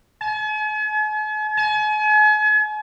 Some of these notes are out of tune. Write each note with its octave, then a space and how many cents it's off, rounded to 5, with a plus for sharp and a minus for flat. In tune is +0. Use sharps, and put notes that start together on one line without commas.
G#5 +45
G#5 +40